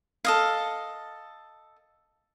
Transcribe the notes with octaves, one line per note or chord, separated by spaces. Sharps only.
A4 D#5 F5